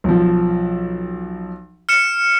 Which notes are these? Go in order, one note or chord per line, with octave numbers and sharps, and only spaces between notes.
B1 F3
F6 C#7 E7